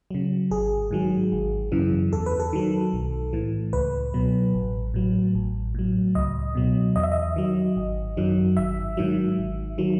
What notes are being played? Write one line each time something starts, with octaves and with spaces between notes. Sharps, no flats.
C#3 F#3
G#1 G#4
G#2 D#3 F#3
G#1
F#2 C#3 E3
E2 A4
B4
A4
D#3 F#3
B1
A2 E3
C#2 B4
B2 F#3
A1
A2 F#3
A1
A2 F#3
C#2 D#5
B2 F#3
E2 D#5
E5
D#5
D#3 F#3
G#1
F#2 D#3 F#3
G#1 E5
G#2 D#3 F#3
G#1
D#3 F#3